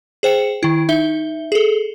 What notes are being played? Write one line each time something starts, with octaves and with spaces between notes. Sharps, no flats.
G#4 C5 G5 C#7
D#3 E4
D#4 E5 G7
G#4 A4